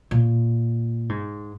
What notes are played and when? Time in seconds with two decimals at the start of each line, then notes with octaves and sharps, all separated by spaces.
0.11 A#2
1.09 G#2